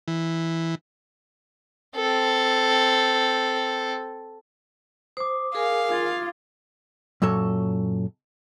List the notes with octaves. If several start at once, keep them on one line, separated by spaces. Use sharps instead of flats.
E3
C4 A4
C5 D6 D#6
G#4 A#4 F5 G#5
F4 D#6 G#6 A6
F#2 A#2 F#3 A4 C#5